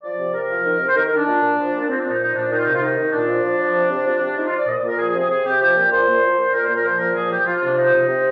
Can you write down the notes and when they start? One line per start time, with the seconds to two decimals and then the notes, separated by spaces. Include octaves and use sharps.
0.03 F3 D5
0.19 C3
0.34 C3 A#4
0.50 F3
0.65 D#3
0.80 C3
0.88 C5
0.96 D#3 A#4
1.07 A#4
1.12 D#3 D4
1.27 A#2
1.42 A#2
1.58 F3
1.73 A#2
1.81 D4
1.89 F3 C4
1.99 D4
2.04 A#2
2.10 D#4
2.20 F3 D#4
2.35 A#2 D4
2.51 D#3 D#4
2.58 F4
2.65 C3 D#4
2.75 F4
2.82 D#3 D#4
2.97 D#3
3.13 A#2 D4
3.28 F3
3.44 F3
3.59 F3
3.75 C3
3.90 C3
4.06 F3
4.21 C3
4.36 F3 D#4
4.47 F4
4.52 F3
4.57 D5
4.67 A#2 D#5
4.78 D5
4.83 A#2 A#4
4.98 F3 G#4
5.09 G#4
5.14 C3
5.19 G#4
5.29 C3 G#4
5.45 C3 G4
5.61 F3 G4
5.76 A#2
5.92 A#2 C5
6.07 A#2
6.22 F3
6.38 A#2
6.53 A#2 A#4
6.64 A#2 C5
6.75 A#4
6.85 F3 C5
6.97 A#2 A#4
7.15 F3 G#4
7.31 F3 G4
7.46 F3 F4
7.56 F4
7.62 C3 D4
7.73 D4
7.77 F3 D#4
7.93 C3
8.09 C3